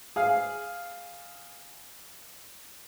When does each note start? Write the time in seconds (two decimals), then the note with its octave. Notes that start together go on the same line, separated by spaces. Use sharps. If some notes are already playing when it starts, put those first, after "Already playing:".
0.16 G#4 F5